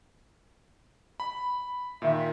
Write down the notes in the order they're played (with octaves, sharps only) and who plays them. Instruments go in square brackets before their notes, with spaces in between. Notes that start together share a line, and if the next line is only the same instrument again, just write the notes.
[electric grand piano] B5
[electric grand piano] A#2 D#3 [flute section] E5